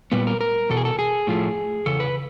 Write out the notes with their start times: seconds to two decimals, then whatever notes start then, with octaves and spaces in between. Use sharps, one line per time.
0.12 A#2 G3 B3 B4
0.27 A#4
0.41 A#4
0.69 E2 B2 A4
0.77 G#4
0.85 A4
0.99 G#4
1.27 A2 F3 A3
1.86 E2 C#3 A4
2.00 B4